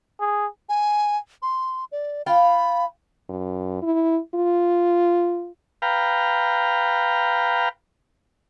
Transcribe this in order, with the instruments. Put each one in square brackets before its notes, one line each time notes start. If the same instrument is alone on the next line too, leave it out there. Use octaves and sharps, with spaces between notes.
[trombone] G#4
[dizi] G#5
C6
D5
[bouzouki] F4 F5 G5 [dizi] B5
[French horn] F#2
E4
F4
[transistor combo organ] B4 F5 G5 A#5